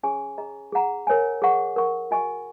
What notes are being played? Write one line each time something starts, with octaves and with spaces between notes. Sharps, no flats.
C#4 G#4 C#5 G#5 C#6
G#4 D#5 A#5
G#4 F#5 A#5
A#4 C#5 G#5
G#4 F#5 C#6
A#4 F#5 C#6
F#4 D#5 G#5 C#6